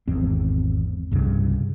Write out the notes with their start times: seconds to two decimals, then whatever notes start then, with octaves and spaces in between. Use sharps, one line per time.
0.08 G#1 E2 C4
1.11 C2 G2 C#3